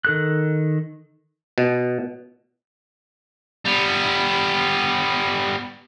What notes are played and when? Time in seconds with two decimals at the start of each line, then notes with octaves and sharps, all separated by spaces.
0.05 D#3 A4 F#6
1.58 B2
3.65 G3 B3